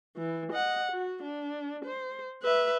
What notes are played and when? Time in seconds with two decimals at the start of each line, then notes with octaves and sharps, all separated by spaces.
0.16 E3
0.52 D#5 F#5
0.92 F#4
1.23 D4
1.85 C5
2.43 B4 E5